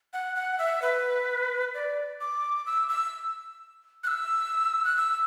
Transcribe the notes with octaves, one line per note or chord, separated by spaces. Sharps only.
F#5
F#5
E5
B4
D5
D6
E6
E6
F#6
E6
F#6
E6